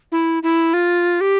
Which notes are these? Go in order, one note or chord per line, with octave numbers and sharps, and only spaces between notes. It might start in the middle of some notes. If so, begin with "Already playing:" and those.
E4
E4
F4
G4